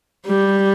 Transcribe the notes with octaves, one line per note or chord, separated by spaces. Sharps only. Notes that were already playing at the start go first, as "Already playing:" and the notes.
G3